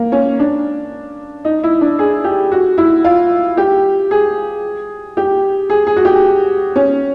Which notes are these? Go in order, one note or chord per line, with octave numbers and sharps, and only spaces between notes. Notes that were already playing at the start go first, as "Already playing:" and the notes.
Already playing: A#3
C#4
D4
D#4
E4
D4
G#4
G4
F#4
E4
F4
G4
G#4
G4
G#4
G#4
F#4
G4
C#4